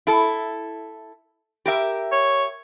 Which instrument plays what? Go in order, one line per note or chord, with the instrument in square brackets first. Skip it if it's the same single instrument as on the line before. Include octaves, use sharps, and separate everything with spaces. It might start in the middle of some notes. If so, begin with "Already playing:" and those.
[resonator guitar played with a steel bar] E4 A4
G4 A#4 E5
[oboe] C#5